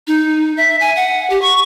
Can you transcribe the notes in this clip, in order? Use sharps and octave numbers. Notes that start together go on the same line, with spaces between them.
D#4
E5
G#5
F#5
G4
C#6